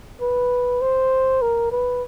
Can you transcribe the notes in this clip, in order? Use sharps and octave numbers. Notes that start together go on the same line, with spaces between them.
B4
C5
A#4
B4